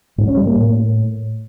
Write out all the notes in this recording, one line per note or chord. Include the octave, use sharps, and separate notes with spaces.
G#2
C#4
G3
A#3
A2